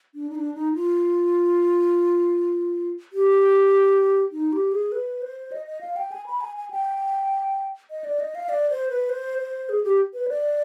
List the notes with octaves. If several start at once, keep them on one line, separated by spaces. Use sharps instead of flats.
D4
D#4
D4
D#4
F4
G4
D#4
G4
G#4
B4
C5
D#5
D#5
F5
G5
G#5
B5
G#5
G#5
G5
D#5
D5
D#5
F5
D5
C5
B4
C5
C5
G#4
G4
B4
D5